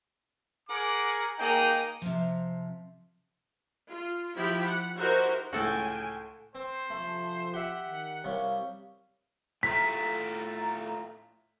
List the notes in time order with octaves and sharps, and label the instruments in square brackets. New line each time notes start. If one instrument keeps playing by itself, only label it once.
[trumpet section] G#4 A#4 D6 [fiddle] F#5
[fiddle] A#3 D#6 [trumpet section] D#4 G#4 G5
[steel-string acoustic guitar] C3 F3
[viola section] F4
F3 E4 G4 G5 B5
F#5
D#4 E4 F#4 G4 A#4 C5
[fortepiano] C#2 A2 [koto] F#4 A4 [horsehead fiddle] G5 G#5
[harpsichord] C4 [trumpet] C5
[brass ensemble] F#2 C3 F3 [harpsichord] A3
[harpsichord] G4 E5 [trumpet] F#5
[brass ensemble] D#3
[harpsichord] C2 G3 C#5 [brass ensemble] A#4 F5
[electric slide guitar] A2 A3 F4 [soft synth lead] A#5 [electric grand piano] B6